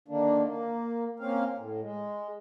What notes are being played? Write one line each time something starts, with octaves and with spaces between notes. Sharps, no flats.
D3 D#3 A#3 D4
A#3
A#3 C4 C#4 F5
A2
G#3